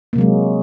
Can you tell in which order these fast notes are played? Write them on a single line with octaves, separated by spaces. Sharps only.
A#3 C3 F#3 G#3